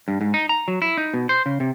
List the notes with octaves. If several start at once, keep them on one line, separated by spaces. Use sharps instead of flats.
G2
G#2
D#4
A#5
F#3
E4
D#4
B2
C5
C#3
C3